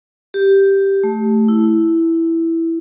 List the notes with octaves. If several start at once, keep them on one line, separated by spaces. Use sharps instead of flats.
G4
A3
E4